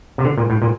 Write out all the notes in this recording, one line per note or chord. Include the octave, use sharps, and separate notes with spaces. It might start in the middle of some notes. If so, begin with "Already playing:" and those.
C3
D3
A#2
A2
A#2